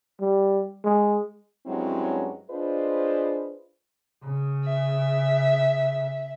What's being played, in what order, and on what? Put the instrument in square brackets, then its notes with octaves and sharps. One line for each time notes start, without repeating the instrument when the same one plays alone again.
[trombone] G3
G#3
[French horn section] G2 F#3 G#3 C4 C#4 E4
D4 F4 G#4 B4 C5 D#5
[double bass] C#3
[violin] E5